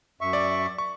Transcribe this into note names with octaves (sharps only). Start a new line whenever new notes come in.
F#2 E5 C#6
D5
C#6